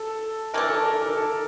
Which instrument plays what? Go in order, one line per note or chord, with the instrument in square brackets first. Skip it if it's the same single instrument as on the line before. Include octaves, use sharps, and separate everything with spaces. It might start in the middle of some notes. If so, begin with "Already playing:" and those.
Already playing: [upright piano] A4
[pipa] E3 A3 D4 [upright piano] A#4
[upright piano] A4
A#4
A#4
A4